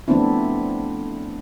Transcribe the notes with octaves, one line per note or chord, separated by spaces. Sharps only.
F3 A3 B3 C4 D4 E4